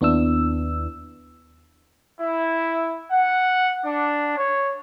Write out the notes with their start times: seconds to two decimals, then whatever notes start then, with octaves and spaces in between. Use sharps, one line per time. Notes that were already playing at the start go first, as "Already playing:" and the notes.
0.01 D#2 B3 D4 E4 E6
2.20 E4
3.11 F#5
3.85 D4
4.37 C#5